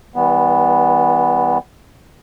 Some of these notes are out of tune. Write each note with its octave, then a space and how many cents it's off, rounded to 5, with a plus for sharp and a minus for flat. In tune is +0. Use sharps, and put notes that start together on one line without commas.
E3 -40 G3 +0 B3 +0